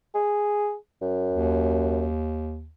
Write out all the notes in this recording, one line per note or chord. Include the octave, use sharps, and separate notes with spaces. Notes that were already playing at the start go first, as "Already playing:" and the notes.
G#4
F#2
D#2